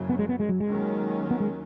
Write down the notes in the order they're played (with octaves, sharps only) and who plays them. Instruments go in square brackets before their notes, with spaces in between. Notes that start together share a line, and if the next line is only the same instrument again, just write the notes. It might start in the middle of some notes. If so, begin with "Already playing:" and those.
Already playing: [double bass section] F#1 F#2 C#3 F#3
[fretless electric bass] B3
G#3
B3
G#3
F#3
G#3
[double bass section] D#2 D#3 F#3 C#4
[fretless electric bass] B3
G#3